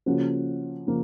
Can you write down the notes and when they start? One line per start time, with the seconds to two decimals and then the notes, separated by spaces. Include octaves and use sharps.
0.06 C#3 F3 A#3 C#4 F#4
0.87 C#3 F3 A#3